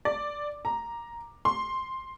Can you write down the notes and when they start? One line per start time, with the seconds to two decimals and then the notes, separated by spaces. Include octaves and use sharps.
0.05 D5
0.65 A#5
1.45 C6